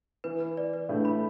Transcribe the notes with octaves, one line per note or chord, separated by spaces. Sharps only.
E3 B4
B4
D5
B4
A2 A3 D4
B5